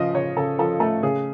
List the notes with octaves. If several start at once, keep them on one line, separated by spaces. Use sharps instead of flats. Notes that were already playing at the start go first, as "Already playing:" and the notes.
Already playing: C#3 F3 D#5
C#3 C#5
C#3 A4
F3 A4
A3 A4
C#3 G#4